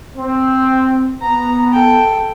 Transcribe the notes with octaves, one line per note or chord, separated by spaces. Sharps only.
C4
B3 A#5
A4 G5